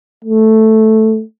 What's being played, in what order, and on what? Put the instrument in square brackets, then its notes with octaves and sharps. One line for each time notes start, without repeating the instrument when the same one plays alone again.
[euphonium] A3